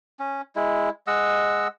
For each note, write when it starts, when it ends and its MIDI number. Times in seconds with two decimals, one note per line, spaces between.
0.19 0.41 61
0.56 0.90 56
0.56 0.90 64
1.07 1.68 56
1.07 1.68 75
1.07 1.68 78
1.07 1.68 88